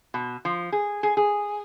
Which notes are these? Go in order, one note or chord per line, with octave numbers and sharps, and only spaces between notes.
B2
F3
G#4
G#4
G#4